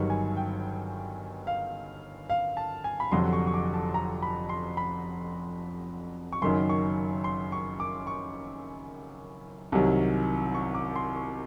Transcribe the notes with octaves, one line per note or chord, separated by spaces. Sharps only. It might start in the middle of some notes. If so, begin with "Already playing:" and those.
Already playing: G1 G2 D#3 F#3 C#6
G#5
G5
F5
F5
A5
G#5
B5
F1 F2 D3 F#3 C6
C#6
C#6
D6
A5
A#5
B5
C6
B5
C#6
F#1 F#2 D#3 F#3 C6
C#6
C6
C#6
D6
C#6
C2 C3 D#3 F#3
C#6
D6
C6
C#6